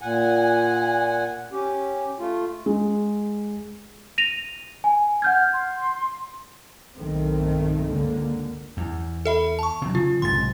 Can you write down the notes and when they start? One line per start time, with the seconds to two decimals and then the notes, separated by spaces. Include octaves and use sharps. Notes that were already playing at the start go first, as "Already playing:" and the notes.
0.01 A#2 F#5 G#5
1.52 C#4 G4
2.20 A3 F4
2.66 G#3
4.18 A#6 D#7 F7
4.84 G#5
5.22 F#5 F6 G6 G#6
5.53 C6
6.99 B1 G2 D#3 A3 C4
7.87 C#2 D3 A#3
8.77 E2
9.25 A4 E5 B5
9.59 A5 C#6
9.82 C3 F#3
9.95 C#3 F4
10.22 B1 G#2 C3 C6 A6